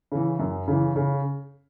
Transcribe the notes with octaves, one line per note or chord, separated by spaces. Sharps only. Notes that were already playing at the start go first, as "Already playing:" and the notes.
C#3 E3
F#2
C#3 E3
C#3